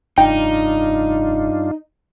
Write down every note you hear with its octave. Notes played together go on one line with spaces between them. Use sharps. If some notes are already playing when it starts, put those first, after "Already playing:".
F1 G2 D4 D#4 F4 G5